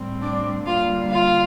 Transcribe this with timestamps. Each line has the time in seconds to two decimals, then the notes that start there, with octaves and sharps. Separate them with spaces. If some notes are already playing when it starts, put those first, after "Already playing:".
Already playing: A2 G3 C4
0.21 D4 D5
0.65 D3 G3 A#3 F4 F5
1.10 F4 F5